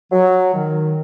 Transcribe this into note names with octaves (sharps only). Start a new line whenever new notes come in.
F#3
D#3